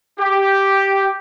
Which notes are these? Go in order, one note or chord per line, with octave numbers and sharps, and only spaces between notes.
G4